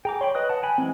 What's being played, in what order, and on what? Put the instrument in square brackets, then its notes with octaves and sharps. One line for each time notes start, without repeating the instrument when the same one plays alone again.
[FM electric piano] G#4 [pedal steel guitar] G5 A#5 D6
[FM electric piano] C#5 [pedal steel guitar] G5 B5 C6
[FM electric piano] B4 F#6 [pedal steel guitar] D#5 D#6
[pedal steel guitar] F#5 A5
G5 G#5 B5
[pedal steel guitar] E3 G#3 [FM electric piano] C4